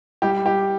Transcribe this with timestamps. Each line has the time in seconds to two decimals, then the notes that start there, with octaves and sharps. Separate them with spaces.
0.22 G3 G4
0.46 G4